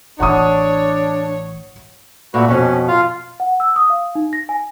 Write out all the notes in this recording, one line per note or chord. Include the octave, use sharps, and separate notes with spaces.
A1 E3 D4 C#5 F#5 C#6 D#6
A#2 A3 F#4 B4
F2 B2 C#4
F4 F5
F#5
E6
D#6
F5
D#4
A#6
G#5